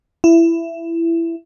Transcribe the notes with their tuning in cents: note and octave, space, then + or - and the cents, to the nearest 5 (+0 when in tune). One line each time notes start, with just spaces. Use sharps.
E4 +15